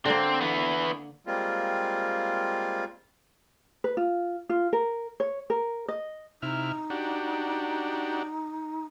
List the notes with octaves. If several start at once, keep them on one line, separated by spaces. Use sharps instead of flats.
D3 A#3 C4
E3 B3
G3 G#3 A#3 C4 F4
B4
F4
F4
A#4
C#5
A#4
D#5
C3 D#4 E4 F6
D4 F#4 G4